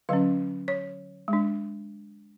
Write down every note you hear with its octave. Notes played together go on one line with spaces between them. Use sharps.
D3 F#3 C#4 F5
C#5
G#3
D4